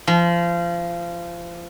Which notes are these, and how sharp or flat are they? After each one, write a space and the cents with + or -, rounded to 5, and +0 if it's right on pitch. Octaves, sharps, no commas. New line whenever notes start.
F3 -25